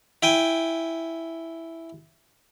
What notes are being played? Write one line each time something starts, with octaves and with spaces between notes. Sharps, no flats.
E4 G5 G#5